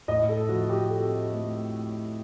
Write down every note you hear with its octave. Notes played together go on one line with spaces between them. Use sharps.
A2 D#5
A4
F3 F#4
G4
C4 A4
A3